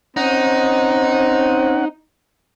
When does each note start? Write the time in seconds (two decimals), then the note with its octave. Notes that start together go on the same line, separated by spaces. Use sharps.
0.17 C4 C#4 D#4 F#5